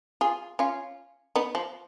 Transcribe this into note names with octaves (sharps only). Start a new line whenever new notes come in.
F4 G#4
C#4 F4
B3 D#4
F3